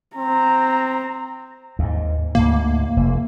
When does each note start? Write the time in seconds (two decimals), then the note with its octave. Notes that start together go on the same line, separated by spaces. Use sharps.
0.17 C4 A#5
1.79 D#2 G#2
2.35 D2 G#2 D3 A#3
2.97 F1